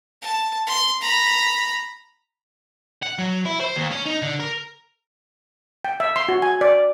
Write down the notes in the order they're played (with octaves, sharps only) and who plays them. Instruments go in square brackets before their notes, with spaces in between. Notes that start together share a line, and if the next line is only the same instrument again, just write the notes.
[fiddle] A5
C6
A#5 B5
[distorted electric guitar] F#5
F#3
E4
C5
D#2
C#4
D#4
D3
A#4
[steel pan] G5
E5
C6
F#4
G#5
D5